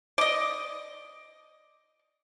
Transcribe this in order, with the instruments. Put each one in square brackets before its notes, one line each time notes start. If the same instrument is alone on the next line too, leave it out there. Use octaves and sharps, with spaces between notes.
[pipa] D5 D#5